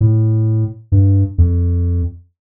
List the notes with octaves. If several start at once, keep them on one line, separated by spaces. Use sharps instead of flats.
A2
G2
F2